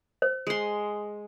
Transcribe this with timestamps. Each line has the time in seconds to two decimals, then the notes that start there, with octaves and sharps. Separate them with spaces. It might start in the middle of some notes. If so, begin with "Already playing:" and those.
0.22 C5
0.47 G#3 C6